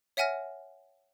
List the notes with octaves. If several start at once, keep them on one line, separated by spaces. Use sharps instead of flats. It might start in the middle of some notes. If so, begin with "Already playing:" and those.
C#5 E5 F#5 G#5 F6 A#6